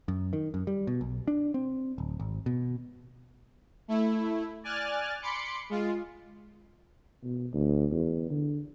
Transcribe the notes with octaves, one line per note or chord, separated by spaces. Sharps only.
F#2
D#3
F#2
G3
B2
B1
D4
C4
D1
G#1
B2
A3 E4
D5 G#5 F6 F#6 A6
B5 C6 D6 C#7
G#3 F4
B2
D2
E2
D3